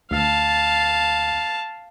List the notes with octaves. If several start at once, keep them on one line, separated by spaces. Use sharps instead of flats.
D2 F5 A5